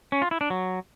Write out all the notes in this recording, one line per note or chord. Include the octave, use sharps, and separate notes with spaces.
C#4
F4
E4
D4
F#3